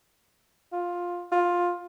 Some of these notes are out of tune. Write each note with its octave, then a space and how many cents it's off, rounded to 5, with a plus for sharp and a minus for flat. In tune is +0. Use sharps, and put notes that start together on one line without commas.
F4 +10
F4 +10